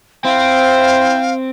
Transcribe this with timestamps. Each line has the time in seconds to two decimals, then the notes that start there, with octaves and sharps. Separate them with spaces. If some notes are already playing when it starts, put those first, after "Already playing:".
0.25 C4 E4 C5 F5 G5